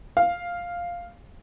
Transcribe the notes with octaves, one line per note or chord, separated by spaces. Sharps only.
F5